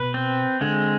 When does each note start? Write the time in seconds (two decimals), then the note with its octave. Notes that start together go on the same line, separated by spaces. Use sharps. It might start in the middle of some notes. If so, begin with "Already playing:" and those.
Already playing: B2 B4
0.14 C4
0.61 D3 G#3